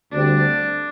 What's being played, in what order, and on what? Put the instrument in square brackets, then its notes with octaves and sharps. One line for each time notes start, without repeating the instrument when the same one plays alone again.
[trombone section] D2 D3 G3 C4 [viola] D4